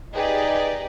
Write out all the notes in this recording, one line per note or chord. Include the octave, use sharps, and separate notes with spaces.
D#4 G4 G#4 B4 D5 D#5